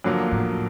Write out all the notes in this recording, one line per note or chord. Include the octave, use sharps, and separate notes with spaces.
F2 D3 F#3 A#3
A2